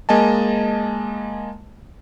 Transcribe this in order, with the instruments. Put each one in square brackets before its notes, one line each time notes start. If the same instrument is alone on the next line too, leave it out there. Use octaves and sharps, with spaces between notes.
[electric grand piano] G#3 A#3 D#5 G#5 A5